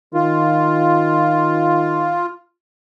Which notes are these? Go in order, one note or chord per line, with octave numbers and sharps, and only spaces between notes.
D#3 F4